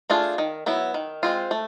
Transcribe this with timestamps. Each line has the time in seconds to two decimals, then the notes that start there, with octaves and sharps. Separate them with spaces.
0.10 A3 D4 F4 G#4
0.38 D#3
0.66 F#3 B3 E4
0.94 D#3
1.23 G#3 C4 F4
1.51 A3